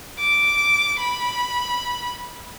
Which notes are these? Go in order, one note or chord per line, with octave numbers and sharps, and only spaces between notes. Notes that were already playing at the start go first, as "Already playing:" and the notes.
D6
B5